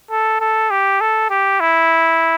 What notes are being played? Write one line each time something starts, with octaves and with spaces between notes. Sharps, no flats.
A4
A4
G4
A4
G4
E4